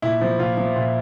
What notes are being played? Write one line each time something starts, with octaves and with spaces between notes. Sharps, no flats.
A#2 E4
F3
A#2 F4
F3
A#2